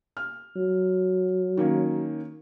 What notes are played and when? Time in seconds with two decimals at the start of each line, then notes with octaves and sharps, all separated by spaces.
0.17 F6
0.56 F#3
1.57 D#3 A#3 C#4